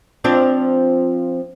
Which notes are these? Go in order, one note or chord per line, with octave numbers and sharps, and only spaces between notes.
F3 C4 D4